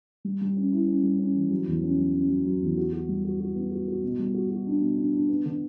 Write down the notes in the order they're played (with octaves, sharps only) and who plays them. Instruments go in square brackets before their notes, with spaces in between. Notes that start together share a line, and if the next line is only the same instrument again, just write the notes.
[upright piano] G3
G3
C#4
E4
C#4
G3
C#4
E3
F#3
E2
C#4
F#3
C#4
F#3
F#3
E2
F#4
F#4
G3
F#4
F#4
B3
F#4
F#4
B2
G3
F#4
F#4
D4
B2
D4
D4
B3
D3